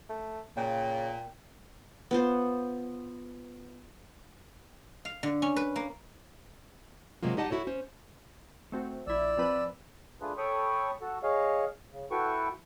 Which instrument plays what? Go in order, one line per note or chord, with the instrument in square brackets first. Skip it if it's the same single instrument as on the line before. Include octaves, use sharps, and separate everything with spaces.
[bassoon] A3
[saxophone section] A#2 [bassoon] C#3 [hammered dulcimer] G5
[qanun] B3 F4 C5
[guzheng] F5
D3
C#4
B4
A#3
[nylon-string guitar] C3 F#3 G#3 A#3 F4
G#3 D#4 G4 D#5 F#5 A5
E4 F#4 A4 C#5
C#4 C5
[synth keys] A3 C4 F#4
[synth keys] A#1 E4 [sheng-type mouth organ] D5 E6
[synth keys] F3 C4 B4
[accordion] A3 D4 F4 G#4 B4
A4 C#5 G5 B5 C#6 D#6
F#4 A4
G#4 C#5 D#5 F5
C#3
E4 F#4 A4 B4 G5 C#6